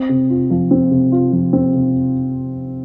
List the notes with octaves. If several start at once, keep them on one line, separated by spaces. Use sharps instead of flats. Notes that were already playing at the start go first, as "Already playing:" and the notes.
Already playing: C4
C3
F4
F3
C4
C3
F4
F3
C4
C3